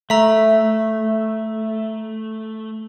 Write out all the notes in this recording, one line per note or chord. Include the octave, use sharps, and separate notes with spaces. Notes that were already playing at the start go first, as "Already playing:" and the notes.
A3 E5 A#5